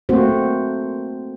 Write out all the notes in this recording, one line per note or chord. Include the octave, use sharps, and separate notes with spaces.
A3 A#3 C4 F#4 C5